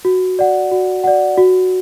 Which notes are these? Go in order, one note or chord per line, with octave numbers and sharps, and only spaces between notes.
F#4
D5 F#5
F#4
D5 F#5
F#4